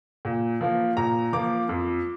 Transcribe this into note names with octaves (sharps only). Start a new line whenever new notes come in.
A#2
F3 A#3
A#2 A#5
F3 A#3 D6
F2